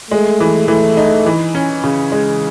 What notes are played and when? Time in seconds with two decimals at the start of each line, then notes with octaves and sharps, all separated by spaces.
0.11 G#3 A3
0.40 E3
0.68 E3 A3
0.97 D#4
1.26 E3
1.55 C#4
1.84 C#3
2.12 G#3